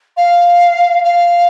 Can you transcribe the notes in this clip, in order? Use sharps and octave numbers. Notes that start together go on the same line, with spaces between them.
F5
F5